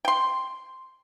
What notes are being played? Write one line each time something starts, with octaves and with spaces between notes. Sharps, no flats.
G5 C6